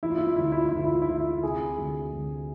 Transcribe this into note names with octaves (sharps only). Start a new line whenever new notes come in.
E3 E4
F4
E4
F4
D2 E4
F4
E4
F4
E4
D2 F4
E4
F4
E4
D2 F4
E4
C3 G#4
D2
D2